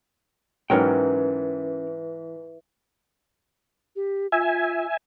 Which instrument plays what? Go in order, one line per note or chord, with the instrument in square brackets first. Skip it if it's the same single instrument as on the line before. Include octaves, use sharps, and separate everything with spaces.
[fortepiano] G#2 F#3 [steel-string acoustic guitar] E3 [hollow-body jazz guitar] C#4 A#4 G5
[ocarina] G4
[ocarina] F4 [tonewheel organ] E5 G#5